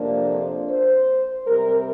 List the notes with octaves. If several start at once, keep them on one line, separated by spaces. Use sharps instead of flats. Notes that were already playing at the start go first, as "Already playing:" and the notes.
Already playing: F2 C3 F3 A#3 D4
C5
C5
C3 G3 C4 A#4